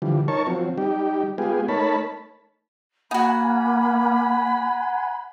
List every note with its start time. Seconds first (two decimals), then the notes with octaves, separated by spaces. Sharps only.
0.02 D3 E3 F3 G3
0.28 D#4 A#4 C#5 A5 C#6
0.47 F3 F#3 C4
0.78 G3 D#4 G4
1.38 G#3 B3 F4 G4 G#4
1.68 A3 D#4 A#4 C#5 A5 B5
3.11 A#3 D#4 F#4 F#5 G#5 B5